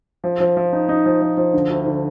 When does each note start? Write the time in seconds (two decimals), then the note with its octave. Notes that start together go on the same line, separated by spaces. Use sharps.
0.24 F3
0.40 F3
0.57 F3
0.73 D#4
0.89 D#4
1.06 F3
1.21 F3
1.37 F3
1.53 D3
1.70 D2
1.87 D3